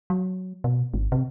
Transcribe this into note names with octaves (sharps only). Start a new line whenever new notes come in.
F#3
B2
G#1
C3